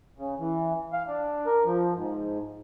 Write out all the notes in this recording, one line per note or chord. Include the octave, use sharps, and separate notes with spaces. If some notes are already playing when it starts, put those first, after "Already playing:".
C#3
E3
F5
D4
A#4
F3
G#2